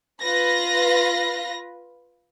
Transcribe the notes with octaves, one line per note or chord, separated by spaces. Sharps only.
F4 B4 A#6